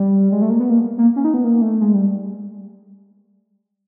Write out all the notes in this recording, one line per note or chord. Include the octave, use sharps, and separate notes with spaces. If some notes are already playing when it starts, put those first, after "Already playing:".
Already playing: G3
G#3
A3
A#3
B3
A#3
A#3
C#4
D#4
B3
A#3
A3
G#3
G3